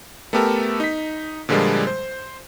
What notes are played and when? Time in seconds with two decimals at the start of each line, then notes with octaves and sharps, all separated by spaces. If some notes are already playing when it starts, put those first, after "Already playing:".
0.33 A3 B3 G4 A4 A#4
0.80 D#4 B6
1.49 A#2 D3 F3 G3 G#3 A#3
1.87 C5